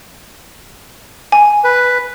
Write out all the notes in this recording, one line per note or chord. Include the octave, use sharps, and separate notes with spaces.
G#5
B4